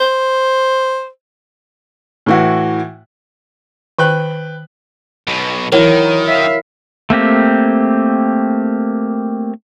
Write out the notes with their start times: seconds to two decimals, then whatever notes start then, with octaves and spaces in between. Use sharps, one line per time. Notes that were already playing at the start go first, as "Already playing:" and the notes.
0.01 C5
2.26 A2 E3 F#4
3.99 D#3 B4 G5 F#6
5.27 B1 B2
5.72 D#3 E3 F#3 E4 A#4
6.27 E5 F5
7.10 A3 A#3 C4 G4